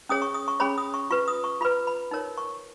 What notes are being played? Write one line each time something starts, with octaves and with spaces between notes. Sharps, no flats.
C#4 G#4 C#5 D#6
C#6
D#6
C#6
C#4 G#4 C#5 B5
D#6
C#6
F4 B4 C#6
D#6
C#6
F4 B4 B5
B5
D#4 A#4 C#5
C#6